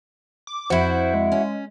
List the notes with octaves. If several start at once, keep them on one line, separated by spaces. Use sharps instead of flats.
D6
F2 E4 F#4 C5
G#3
C#4